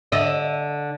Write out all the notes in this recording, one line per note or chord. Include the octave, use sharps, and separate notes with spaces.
D3 D#5 E5